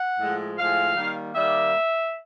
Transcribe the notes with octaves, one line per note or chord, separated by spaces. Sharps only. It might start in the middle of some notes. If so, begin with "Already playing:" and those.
Already playing: F#5
A2 F3 G#3
A2 F3 G#3 F5
D#3 G3 A#3
D#3 G3 A#3 E5